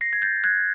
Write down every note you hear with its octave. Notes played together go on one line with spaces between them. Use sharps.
A#6 C7
G#6
G6 A6
F#6 G#6